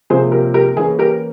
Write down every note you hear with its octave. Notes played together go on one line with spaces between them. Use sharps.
C3 F3 A#3 C#4 G#4 C5
G4 A#4
G4 A#4
E3 A#3 C#4 G#4
G4 A#4